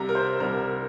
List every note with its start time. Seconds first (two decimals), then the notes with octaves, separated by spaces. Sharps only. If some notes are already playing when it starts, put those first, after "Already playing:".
Already playing: C2 C3 G3 A#5
0.09 A#4
0.15 C5
0.40 C2 C3 G3 A#4